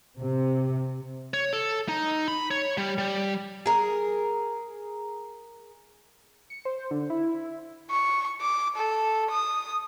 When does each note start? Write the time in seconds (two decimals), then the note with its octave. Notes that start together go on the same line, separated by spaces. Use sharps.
0.19 C3
1.34 C#5
1.53 A4
1.88 D#4
2.28 B5
2.51 C#5
2.78 G3
2.98 G3
3.66 G#4 A#4
6.50 C#7
6.65 C5
6.91 D3
7.10 E4
7.90 C#6
8.41 D6
8.76 A4
9.31 D#6